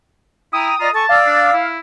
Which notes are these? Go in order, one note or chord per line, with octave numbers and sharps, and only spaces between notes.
E4 G5 A#5 D#6
F4 D5 D#5 A#5
A4 G#5 A5 C#6
D5 F5 D6 E6
D4
E4